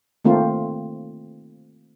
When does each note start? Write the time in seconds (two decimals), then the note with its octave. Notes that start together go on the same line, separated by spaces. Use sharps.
0.25 D#3 A3 A#3 C4 F4